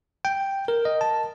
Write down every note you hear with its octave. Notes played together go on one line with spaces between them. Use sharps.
G5
A#4
D#5
A5